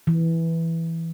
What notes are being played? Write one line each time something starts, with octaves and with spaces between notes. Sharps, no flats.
E3